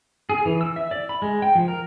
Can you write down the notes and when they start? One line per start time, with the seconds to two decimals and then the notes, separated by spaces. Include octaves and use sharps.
0.30 G#4
0.45 E3
0.61 E6
0.76 E5
0.91 D5
1.09 B5
1.22 G#3
1.42 G5
1.55 F3
1.68 A#4